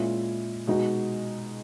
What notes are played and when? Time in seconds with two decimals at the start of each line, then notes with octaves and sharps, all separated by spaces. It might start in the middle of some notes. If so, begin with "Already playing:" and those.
Already playing: A#2 G#3 C#4 E4
0.67 B2 G#3 D#4 F#4